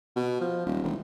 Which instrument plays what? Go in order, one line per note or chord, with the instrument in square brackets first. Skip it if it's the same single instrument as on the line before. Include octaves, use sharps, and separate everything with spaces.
[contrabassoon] B2
F3
D#1
E1